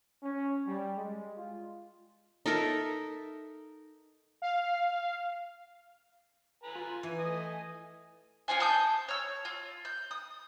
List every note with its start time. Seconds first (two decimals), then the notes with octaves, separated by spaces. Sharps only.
0.23 C#4
0.67 G3
0.98 G#3
1.37 F4
2.46 D#4 A4 A#4 E5
4.42 F5
6.63 B4 G#5 A#5
6.75 F4
7.03 E3 G#5
7.19 A3 D#5
8.48 C#4 F4 C5 G#5
8.60 A5 D#6 G6
9.08 C#5 E6
9.45 F4
9.85 G6
10.11 D#6